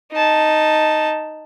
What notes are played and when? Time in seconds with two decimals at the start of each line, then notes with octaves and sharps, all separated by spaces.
0.12 D#4 A5